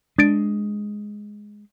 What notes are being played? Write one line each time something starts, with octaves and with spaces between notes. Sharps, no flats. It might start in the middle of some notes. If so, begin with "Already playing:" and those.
G#3 D4 A6 D7